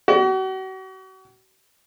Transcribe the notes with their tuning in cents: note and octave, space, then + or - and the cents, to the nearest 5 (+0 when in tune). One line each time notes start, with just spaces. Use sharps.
F#4 +40